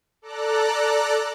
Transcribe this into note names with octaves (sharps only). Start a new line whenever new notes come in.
A4 D5 A#5 F#6